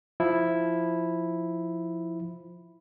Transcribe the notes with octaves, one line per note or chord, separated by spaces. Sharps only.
F3 E4